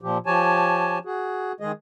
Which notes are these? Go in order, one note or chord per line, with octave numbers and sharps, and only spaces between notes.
A#2 F3 G4
F3 G4 C#5 G#5 A5
F#4 G#4
D#3 G#3 G#4 D#5